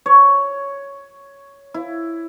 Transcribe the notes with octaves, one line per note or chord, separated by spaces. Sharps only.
C#5
E4